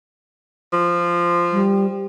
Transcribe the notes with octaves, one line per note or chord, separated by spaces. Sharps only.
F3
G3